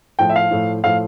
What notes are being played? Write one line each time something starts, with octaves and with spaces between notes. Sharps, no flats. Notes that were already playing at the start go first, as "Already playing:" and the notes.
A2 F3 G5
E5
F5
A2 F3
A2 F3 F5